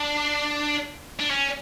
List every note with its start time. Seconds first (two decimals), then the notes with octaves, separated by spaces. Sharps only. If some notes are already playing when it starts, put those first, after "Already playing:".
Already playing: D4
1.19 D4
1.30 C#4